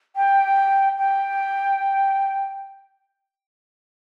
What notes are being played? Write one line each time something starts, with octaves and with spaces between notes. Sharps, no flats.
G5
G5